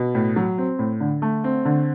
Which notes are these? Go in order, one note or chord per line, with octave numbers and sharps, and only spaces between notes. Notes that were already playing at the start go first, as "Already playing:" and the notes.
Already playing: B2
A2
F#3
C4
A2
D3
A3
C4
D3